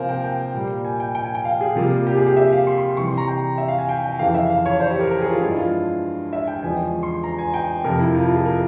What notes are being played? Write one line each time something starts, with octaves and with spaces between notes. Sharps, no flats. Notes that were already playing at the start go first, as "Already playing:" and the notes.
Already playing: C3 F3 A#3 A#4 C5 F5 G#5
G5
G5
A#2 G3 A#3
G#5
G5
G5
G#5
G5
F5
G#4
C3 G3 A#3 F4
G4
G#4
G4
E5
F5
C6
C6
C3 E3 G3 C#6
C6
A#5
G5
E5
F5
G#5
G5
G5
F2 C#3 E3 F5
E5
F5
C#5
C5
G4
A#4
A#4
G#4
F4
G2 F3 G#3 E4
F4
E5
G5
E2 C#3 F3 G#3 G#5
C6
A#5
G#5
G5
F2 C3 F3 A#4
E4
F4
F4
G#4
A#4